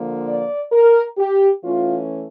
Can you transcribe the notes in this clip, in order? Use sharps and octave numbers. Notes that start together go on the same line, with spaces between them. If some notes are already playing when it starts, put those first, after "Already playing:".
Already playing: D3 F3 A#3
D5
A#4
G4
E3 A3 C#4 F4